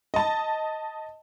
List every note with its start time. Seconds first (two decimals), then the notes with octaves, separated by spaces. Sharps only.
0.14 D#5 A5